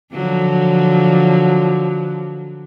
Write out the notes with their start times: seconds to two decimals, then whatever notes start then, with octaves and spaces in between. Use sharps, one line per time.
0.13 D3 F3 F#3